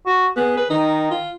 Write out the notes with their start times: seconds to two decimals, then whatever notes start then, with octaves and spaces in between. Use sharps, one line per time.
0.06 F#4
0.37 B3 G#4
0.57 B4
0.70 D#3 D#4
1.11 F4